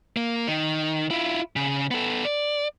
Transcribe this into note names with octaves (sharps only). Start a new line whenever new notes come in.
A#3
D#3
E4 F4
C#3
B3 A4
D5